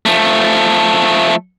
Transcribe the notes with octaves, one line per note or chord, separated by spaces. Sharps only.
F3 A3